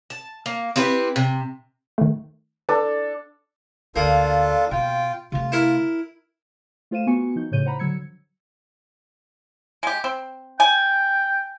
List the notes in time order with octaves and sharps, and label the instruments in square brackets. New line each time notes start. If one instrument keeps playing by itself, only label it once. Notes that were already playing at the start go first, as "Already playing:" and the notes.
[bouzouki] A5
A#3
C4 E4 G4 B4
C3
[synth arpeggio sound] D#3 A3
[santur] D4 A4 [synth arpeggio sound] B4
[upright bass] D2 [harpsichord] A#3 [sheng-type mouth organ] D4 F4 A4
[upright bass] B2 [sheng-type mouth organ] F4 G5
[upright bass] C3 A3 [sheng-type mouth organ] F4
[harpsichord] E4 A#4
[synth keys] A3 F4 C5 F5 D#7 E7
B3 F4 F#4 G#5 C#6 C#7
F3 D#4 G6
A2 C#3 C#5 G6 D#7
C5 F#5 A#5 B5
D3 F#3 E6 G#6 C#7
[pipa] G#3 G4
C4
[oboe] G5 [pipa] G#5